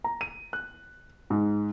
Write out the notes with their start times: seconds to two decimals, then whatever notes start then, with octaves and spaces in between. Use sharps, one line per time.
0.04 A#5
0.21 D#7
0.53 F#6
1.30 G#2